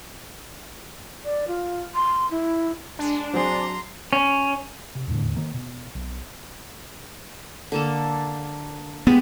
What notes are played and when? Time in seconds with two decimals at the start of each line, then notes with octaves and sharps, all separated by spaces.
1.24 D5
1.48 F4
1.95 C6
2.31 E4
2.99 G#3 D4
3.34 F#3 C4 G#4 A#5 C6
4.13 C#4
4.95 C3
5.08 D#1 E2 A2 D3
5.37 D#3 A#3
5.54 B2
5.95 B1
7.72 D3 A#3 A4
9.07 G#3 B3 G4